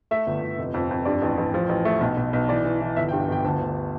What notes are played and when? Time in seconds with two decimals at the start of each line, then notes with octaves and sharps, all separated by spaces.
0.11 A3 E5
0.27 G1
0.42 G1
0.59 F1
0.74 F2
0.91 F2
1.05 G2 D5
1.22 A1
1.37 A1
1.54 F3
1.69 A1
1.85 A3
2.01 B1
2.17 B1
2.33 B1
2.49 E3 D5
2.65 E3
2.81 E3
2.96 G1 E5
3.09 G5
3.12 G2
3.28 G1 G5
3.44 D2 A5
3.60 D2